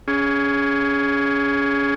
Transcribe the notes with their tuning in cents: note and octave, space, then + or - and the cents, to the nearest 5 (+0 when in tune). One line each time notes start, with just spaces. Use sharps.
C#4 +20 G#4 +0